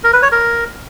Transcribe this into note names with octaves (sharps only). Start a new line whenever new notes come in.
A#4
B4
C#5
A#4